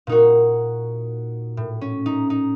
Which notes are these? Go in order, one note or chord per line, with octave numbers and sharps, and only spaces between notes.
A#2 D#4 F#4
A2
C#4
D#4
D#4